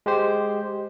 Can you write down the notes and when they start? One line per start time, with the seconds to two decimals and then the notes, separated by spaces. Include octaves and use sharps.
0.06 G#3 G4 C5